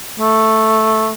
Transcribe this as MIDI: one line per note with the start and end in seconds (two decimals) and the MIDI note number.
0.20 1.11 57